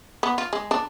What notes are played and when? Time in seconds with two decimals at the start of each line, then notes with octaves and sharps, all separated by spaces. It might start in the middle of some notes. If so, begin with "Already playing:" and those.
0.23 B3
0.38 F4
0.53 G#3
0.71 D4